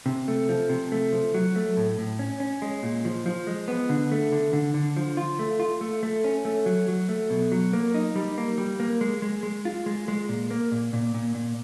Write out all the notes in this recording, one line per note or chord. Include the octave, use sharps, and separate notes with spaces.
C3
A3
F3
C3
A3
F3
F#3
A3
A2
A2
C#4
C#4
G#3
A#2
F3
F3
G#3
B3
D3
A3
D3
D3
D3
F3
F4
A3
F4
A3
A3
C#4
A3
F#3
F#3
A3
B2
F#3
A#3
D#4
G3
A#3
G3
A#3
G#3
G#3
G#3
F4
G#3
G#3
A#2
A#3
A#2
A#2
A#2
A#2